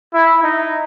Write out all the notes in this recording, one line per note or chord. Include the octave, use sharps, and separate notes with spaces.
E4
D#4